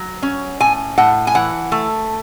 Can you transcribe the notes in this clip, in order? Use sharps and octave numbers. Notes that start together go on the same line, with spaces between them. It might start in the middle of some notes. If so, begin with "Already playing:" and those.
Already playing: F#3
C#4
A2 G#5
A2 F#5
G#5
E3 F#5
A3